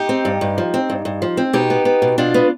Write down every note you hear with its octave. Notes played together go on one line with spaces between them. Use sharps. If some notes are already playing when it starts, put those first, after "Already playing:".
Already playing: D#4 G4
C4
G2
G2
F3
C4
G2
G2
F3
C4
B2 D#4 G4
B3
B3
B2
B2 D4 F4
B3